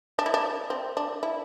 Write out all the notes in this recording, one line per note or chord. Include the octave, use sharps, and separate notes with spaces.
D4
E4
D4
C4
D4
E4